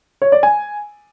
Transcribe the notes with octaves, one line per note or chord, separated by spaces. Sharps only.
C#5
D5
G#5